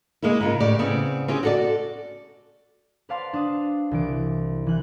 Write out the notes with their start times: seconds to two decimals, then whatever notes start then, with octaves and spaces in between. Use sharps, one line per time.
0.22 G#3 A#3 C#4 E4
0.41 G#2 C#3 F4
0.60 A2 G4 D5
0.79 C#3 B3 C4
1.28 C4 C#4 G4 G#4
1.43 F#4 A4 D5
3.09 B4 C5 D5 F5 A5 C6
3.33 D4 D#6
3.91 C2 E3 D7
4.66 E3 F#6 G6